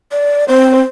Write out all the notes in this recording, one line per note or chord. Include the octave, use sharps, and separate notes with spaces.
D5
C4 C5